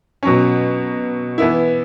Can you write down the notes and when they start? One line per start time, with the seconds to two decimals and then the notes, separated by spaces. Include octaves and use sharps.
0.23 B2 F#3 C#4
1.38 E3 B3 E4